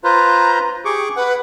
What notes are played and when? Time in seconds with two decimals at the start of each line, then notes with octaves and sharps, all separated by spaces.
0.04 F4 B4 C5 A#5
0.85 G4 G#4 C#6 D6
1.16 B4 F#5